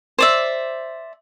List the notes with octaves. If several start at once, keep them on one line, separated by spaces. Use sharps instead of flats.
C5 D5 E5